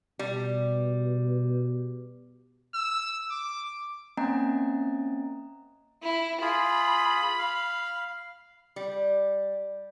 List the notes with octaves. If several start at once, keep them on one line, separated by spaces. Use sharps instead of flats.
B2 G3
E6
D6
A#3 C4 C#4 D#5 G#5 A#5
E4
F4 G#4 B5
F5
G3